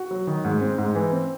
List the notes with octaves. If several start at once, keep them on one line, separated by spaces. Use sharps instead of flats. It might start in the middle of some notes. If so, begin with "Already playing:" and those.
Already playing: F#4
F#3
D#3
G#2
C4
G#2
E3
C4